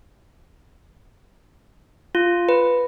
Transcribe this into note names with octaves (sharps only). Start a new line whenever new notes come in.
F4
B4